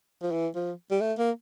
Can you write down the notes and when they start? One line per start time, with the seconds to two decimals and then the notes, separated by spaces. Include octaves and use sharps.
0.22 F3
0.32 E3
0.56 F3
0.91 G3
1.01 A3
1.18 A#3